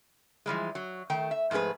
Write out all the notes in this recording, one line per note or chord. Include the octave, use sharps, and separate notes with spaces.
E3 F3 G3 G#3
F#3
D#3 A3 G5
E5
G#2 F3 A3 G#4 B4